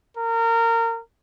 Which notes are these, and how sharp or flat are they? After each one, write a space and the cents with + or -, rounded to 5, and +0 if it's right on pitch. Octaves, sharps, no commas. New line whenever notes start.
A#4 -25